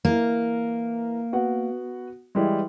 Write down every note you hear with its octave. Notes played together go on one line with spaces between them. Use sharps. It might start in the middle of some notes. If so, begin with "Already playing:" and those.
E3 A#3 A#4
B3 F#4 F#5
E3 G3 G#3